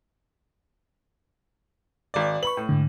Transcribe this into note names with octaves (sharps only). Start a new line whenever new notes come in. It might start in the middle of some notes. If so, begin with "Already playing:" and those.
G#1 D5
B4 B5 C#6 F#7
A2
G#2 D3